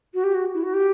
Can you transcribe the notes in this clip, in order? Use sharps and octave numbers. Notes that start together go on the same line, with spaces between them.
F#4
G4
F#4
E4
F#4
G4